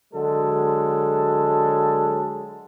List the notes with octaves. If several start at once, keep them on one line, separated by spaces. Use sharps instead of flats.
D3 F#3 G#3 A4